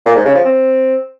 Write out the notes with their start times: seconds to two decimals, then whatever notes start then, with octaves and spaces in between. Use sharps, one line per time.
0.06 A#2
0.15 G#2
0.25 C#3
0.35 F3
0.45 C4